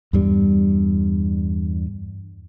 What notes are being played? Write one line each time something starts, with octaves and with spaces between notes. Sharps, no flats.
E2 G2 G3